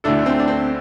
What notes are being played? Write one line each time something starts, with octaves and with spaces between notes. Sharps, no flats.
D2 D3 A3 D4 E4 A4
C4
D4
C4